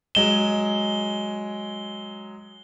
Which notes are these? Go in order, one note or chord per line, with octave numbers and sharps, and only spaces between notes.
F#3 G#3 E7 G7